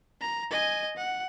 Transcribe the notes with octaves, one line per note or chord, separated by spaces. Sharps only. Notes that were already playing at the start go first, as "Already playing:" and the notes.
A#5
D#5 G#5
F#5